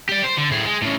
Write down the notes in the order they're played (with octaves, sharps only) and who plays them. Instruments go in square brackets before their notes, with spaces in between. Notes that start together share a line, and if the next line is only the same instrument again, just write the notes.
[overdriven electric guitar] G4 D5
C5
D3
A2 G#4
G#3
A2 C#3